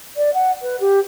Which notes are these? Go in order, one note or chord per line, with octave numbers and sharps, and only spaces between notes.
D5
F#5
B4
G4